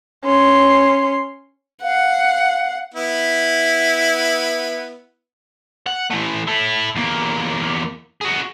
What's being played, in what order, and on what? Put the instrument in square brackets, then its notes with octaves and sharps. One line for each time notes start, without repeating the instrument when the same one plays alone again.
[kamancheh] C#4 C6
[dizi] F5 [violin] F#5
[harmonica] B3 E4
[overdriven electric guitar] F#5
E3 A3
E4 A4
E2 A#3
F#4 G#4